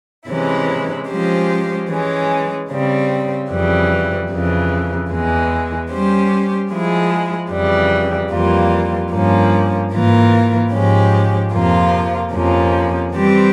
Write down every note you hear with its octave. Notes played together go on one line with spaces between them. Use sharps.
C3 E3 G#3 C#4 E4
F3 G#3 C#4 G4 C5
E3 G#3 C#4
C#3 G3 C4
F2 C#3 E3 G3
F2 C#3 E3
E2 E3 G#3
G3 C#4 G4 C5
F3 G#3 E4 G#4
F2 C#3 E3 G3
F2 E3 G3 A#3 F4
G2 F3 A#3 C#4
G#2 E3 A#3 F4 A#4
G#2 F3 G#3 C#4 G4
F2 C3 F3 A#3 F4
F2 C3 F3 A#3 C#4
E3 G3 C4 G4 C5